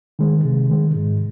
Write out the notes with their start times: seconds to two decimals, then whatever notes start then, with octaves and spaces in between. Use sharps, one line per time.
0.19 D#3 G#3
0.45 C3
0.70 D#3 G#3
0.96 G#2